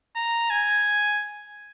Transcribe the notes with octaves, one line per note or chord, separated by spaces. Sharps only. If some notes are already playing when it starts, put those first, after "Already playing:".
A#5
G#5